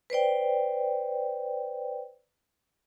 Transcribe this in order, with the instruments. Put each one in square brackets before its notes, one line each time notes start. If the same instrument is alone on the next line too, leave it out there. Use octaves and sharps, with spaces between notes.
[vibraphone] B4 C5 D5 G5